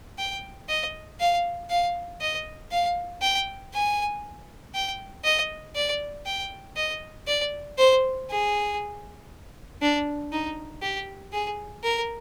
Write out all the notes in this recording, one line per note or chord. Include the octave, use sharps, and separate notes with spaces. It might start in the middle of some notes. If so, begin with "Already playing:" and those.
G5
D#5
F5
F5
D#5
F5
G5
G#5
G5
D#5
D5
G5
D#5
D5
C5
G#4
D4
D#4
G4
G#4
A#4